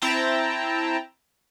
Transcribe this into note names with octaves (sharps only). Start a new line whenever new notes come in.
C4 E4 G5 A5 A#5